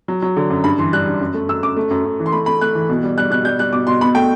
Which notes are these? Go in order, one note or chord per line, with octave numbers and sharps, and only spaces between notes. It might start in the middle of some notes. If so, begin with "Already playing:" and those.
F#3
F#3
D3
F#2
G2 B5
E3 C6
G3 F#6
G2
F#2
A3
F#2 E6
F#2 D6
A3
F#2
F#2
E3
C6
A3 B5
A3 B5
A3 F#6
E3
B2
G3
G3 F#6
B2 F#6
G3 G6
G3 F#6
B2 D6
B2 C6
B2 B5
A3 G5